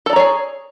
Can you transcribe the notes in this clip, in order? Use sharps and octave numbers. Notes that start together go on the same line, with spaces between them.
G#4 A4 C#5 D5 A#5